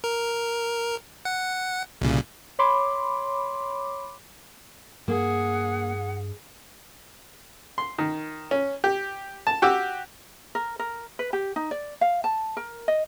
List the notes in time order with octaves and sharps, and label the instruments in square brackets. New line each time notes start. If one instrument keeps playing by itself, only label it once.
[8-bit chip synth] A#4
F#5
C2 A#2 C#3
[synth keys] C#5 B5 C6 D6
[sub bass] G2 [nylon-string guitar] A#3 [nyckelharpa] G#4 [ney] F#5
[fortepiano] C6
D#3
C#4
G4
A5
F#4 G4 D6 E6
[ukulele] A#4
A#4
B4
G4
D#4
D5
F5
A5
A#4
D#5